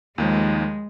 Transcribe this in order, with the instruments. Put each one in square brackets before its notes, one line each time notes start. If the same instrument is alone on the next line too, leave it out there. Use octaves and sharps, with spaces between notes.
[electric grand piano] D#2 D#3 F3 [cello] G#3